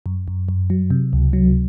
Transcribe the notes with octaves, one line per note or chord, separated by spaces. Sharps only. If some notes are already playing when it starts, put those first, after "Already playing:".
F#2
F#2
F#2
F#3
C3
C#2
F#3